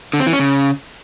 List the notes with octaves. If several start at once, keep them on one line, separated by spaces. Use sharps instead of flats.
D3
C4
E3
C#4
C#3